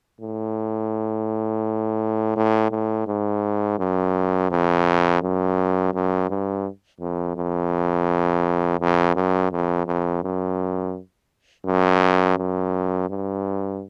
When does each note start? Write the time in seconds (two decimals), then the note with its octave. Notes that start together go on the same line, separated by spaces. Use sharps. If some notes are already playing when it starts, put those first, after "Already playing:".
0.21 A2
2.36 A2
2.71 A2
3.07 G#2
3.79 F#2
4.51 F2
5.22 F#2
5.94 F#2
6.29 G2
7.00 F2
7.36 F2
8.80 F2
9.15 F#2
9.52 F2
9.87 F2
10.23 F#2
11.65 F#2
12.37 F#2
13.10 G2